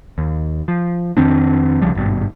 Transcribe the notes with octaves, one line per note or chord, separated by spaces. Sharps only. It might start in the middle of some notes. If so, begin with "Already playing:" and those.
D#2
F3
F2 D#3 C4 D4
C2 C#3 F3 G3
G#1 G2 B2